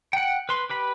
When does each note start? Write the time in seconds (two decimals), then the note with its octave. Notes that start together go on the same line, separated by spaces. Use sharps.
0.13 F#5 G5
0.49 B4 C6
0.70 G4 B4 B5